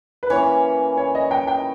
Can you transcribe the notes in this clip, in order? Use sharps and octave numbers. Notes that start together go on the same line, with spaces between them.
B4
E3 A#3 C#4 C#5
C#5
D#5
G5
G5